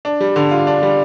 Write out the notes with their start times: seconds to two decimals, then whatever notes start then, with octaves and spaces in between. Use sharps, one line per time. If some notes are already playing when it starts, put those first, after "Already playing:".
0.05 D4
0.20 G3
0.36 D3
0.51 F4
0.67 D4
0.82 G3